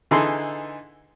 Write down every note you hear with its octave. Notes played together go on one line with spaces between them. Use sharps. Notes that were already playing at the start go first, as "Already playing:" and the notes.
D3 E3 D#4 G#4 A4 C6